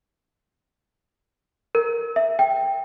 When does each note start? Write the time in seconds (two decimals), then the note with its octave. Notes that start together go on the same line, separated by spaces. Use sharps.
1.75 A#4
2.16 E5
2.39 G5